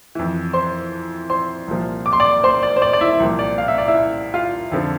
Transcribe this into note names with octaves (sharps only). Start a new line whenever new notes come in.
F2 E3
C5 C6
C5 C6
C2 A#2 F3
D6
C6
D5 D6
C5 C6
D5
C5
D5
D5
E4 E5
C2 A#2 F3
D5
F5
E5
D5
E4 E5
F4 F5
F2 D3 F3